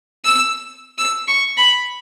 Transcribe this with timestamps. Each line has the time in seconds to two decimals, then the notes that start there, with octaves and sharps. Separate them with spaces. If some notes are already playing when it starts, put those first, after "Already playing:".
0.25 E6
0.98 E6
1.28 C#6
1.57 B5